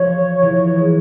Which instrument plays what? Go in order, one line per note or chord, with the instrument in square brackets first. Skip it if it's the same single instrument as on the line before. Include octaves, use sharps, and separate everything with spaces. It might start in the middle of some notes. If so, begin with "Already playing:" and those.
Already playing: [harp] F3 [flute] C#5
[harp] E3
G#3